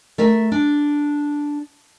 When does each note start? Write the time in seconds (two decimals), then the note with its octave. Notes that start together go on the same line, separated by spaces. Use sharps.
0.18 A3 A#4 E5
0.52 D4